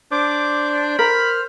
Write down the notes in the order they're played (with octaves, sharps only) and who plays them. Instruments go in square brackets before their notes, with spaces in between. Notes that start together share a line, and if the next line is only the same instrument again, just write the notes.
[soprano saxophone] D4 [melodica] C5 [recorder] D6
[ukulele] A#4 [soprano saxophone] B5 [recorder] F6